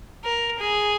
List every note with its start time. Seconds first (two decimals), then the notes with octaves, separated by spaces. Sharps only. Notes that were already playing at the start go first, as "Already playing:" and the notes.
0.24 A#4
0.59 G#4